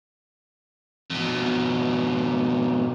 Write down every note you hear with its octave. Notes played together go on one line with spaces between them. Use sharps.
F2 B2